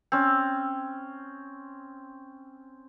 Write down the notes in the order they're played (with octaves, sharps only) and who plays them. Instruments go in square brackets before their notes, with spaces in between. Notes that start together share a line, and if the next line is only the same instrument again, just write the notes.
[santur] C4 C#4